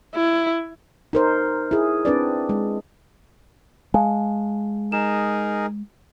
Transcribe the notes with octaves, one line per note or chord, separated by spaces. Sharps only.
E4
D#4 A#4 C5
E4 G#4
C4 D4 B4 D5
G#3
G#3 F5 G#5 A5
D#4 G#4 A#4 E7